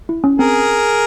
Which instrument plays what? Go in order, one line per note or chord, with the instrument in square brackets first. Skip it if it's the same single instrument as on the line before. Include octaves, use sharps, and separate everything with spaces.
[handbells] E4
C#4
[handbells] C4 [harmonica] G#4 A#4